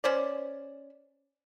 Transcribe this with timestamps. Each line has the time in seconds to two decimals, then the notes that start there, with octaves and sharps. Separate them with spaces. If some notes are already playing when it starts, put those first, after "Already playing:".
0.04 C#4 C5 D5